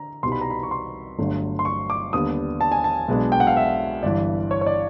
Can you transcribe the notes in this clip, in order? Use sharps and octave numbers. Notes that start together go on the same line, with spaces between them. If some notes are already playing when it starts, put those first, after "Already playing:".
Already playing: D3 A#5
C2 B2 G3 B3 D#4 C6
B5
A#5
B5
C#6
C6
G1 G2 D3 F#3 A3
C6
C#6
D6
D#2 D3 G3 B3 D#6
A5
G#5
A5
B1 B2 G#3 B3 D4
G5
F#5
F5
E5
G1 G2 E3 D5
C#5
C#5
D5